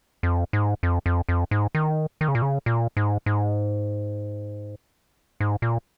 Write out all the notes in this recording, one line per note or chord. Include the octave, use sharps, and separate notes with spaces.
F2
G#2
F2
F2
F2
G#2
D#3
D#3
C#3
A#2
C#3
A#2
G#2
G#2
G#2
A#2